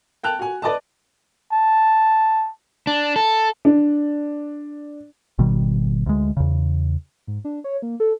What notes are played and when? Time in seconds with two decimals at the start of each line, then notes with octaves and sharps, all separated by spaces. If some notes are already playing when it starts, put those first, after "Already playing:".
0.24 G5 A5 F#6 F7
0.39 F#4 G#5
0.62 B4 D5 D#5 A5
1.53 A5
2.87 D4
3.16 A4
3.65 D4
5.38 G#1 B2 D#3 G3
6.06 D2 G#3
6.37 E2 C#3
7.27 G#2
7.45 D4
7.64 C#5
7.82 A#3
8.00 A4